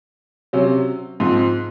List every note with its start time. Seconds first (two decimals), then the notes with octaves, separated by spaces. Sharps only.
0.53 C3 F#3 C#4
1.20 G#2 F3 C4